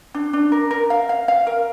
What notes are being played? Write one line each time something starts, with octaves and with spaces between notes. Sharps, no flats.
D4
D4
A#4
A#4
F5
F5
F5
A#4